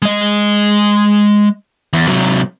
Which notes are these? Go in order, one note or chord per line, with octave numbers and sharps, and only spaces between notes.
G#3 D#5
E2
C3 F#3